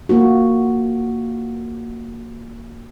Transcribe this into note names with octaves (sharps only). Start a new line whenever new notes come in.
A#3 F4 F#4